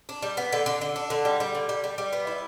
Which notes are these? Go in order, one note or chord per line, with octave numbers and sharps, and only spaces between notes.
D4
G3
B3
D3
D3
D3
D4
D3
G3
G3
D3
G3
G3
G3
B3
E4